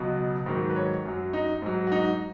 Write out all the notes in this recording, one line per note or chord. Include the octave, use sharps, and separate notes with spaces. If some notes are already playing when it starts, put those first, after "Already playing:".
Already playing: C#2 B2 F#3
G#2 D#3 F#3
B4
C#5
F#2 F#3
D#4
G#2 F#3
F#4
D#4